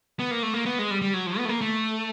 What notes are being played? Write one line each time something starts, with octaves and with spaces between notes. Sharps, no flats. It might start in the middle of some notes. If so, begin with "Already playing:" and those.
B3
A#3
A3
A#3
B3
G#3
G3
G3
F#3
F3
B3
A3
A#3
A3